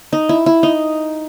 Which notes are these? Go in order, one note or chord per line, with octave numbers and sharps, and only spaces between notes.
D#4
E4
E4
D#4